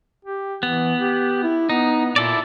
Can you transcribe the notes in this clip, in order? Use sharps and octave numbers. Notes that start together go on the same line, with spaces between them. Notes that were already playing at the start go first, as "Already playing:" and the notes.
G4
E3 B3
G4
E4
B3 D#4
A#2 E4 A4 D5